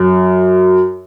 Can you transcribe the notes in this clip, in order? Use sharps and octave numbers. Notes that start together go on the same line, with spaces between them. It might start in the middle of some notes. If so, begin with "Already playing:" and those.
Already playing: F#2